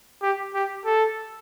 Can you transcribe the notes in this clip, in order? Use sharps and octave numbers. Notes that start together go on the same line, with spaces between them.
G4
G4
A4